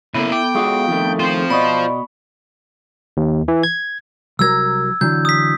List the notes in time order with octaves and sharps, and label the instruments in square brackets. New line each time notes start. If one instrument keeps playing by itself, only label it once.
[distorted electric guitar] C#3 A#3 [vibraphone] B3 A4 [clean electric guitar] E4
[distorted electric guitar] G5 [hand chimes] D6
[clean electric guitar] G#3 F4 F#4 [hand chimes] F5 C#6 D#6
[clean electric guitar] F2 D#3 A3
[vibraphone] C4 G5 [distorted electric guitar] F4 C5
[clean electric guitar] B2 D#5 [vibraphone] D5 [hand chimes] B5 C#6
[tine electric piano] D#2
E3
G#6
[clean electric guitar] C2 F#3 A#4 [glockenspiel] E6 G#6
[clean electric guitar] D3 E3 F#3 [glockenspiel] G6
[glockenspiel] D#6 B6